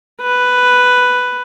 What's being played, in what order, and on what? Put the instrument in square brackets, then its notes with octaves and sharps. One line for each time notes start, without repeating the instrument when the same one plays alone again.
[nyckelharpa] B4